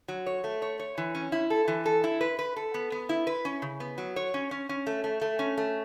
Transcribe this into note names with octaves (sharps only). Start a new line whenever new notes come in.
F#3
C#5
A3
C#5
C#5
E3
C#4
E4
A4
E3
A4
E4
B4
B4
A4
B3
B3
E4
B4
C#4
C#3
B3
F#3
C#5
C#4
C#4
C#4
A3
A3
A3
C#4
A3